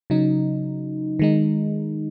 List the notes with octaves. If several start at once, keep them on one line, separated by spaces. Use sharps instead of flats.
C#3 F#3 D#4
D#3 G#3 D#4